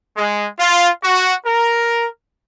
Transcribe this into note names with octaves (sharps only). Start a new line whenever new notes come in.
G#3
F4
F#4
A#4